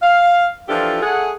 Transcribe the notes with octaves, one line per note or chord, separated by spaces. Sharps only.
F5
E3 F3 D4 F4 G4 A4
A3 G#4 F#5